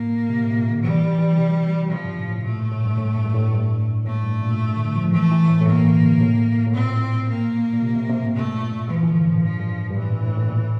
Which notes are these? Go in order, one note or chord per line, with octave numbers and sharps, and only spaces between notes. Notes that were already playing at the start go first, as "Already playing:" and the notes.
Already playing: A2 A#3
C3
A2
C3
A#2
D3
E3 G3
E3
C3
C3 F3
G2
A2
A2
A#2 A3
A2
G2
A2
G2
G2
A2
G2
A2 A3
G2
A#2
D3
F3
E3 A3
E3
A2
A2
G2 A#3
E3
D3
C3
A#2
A2
A2
A#2 C4
A#3
A#2
C3
C3
C3
A2
G2 A3
A#2
A#2
E3 F3
E3
D3
G2
A2
G2 F3
A2
G2
G2
A2 E3
A#2
A2
A2
A#2
A2